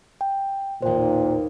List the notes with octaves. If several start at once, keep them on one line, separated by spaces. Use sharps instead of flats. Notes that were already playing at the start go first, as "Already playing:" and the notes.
G5
A1 D#2 A#2 C5 G5